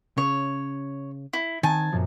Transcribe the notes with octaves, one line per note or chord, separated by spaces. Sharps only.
C#3 C#5
E4
D#3 C4 G#5 A5
F#2 A#2 F3